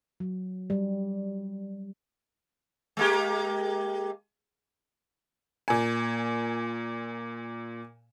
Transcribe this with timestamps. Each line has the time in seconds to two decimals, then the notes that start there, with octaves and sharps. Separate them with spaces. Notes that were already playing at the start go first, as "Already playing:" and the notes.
0.20 F#3
0.70 G3
2.97 G#3 A#3 G4
5.68 A#2 G#5